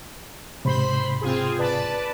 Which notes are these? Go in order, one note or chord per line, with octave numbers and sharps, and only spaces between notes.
G#2 C3 C5 B5 C6
C4 F4 G#4
B4 D5 A5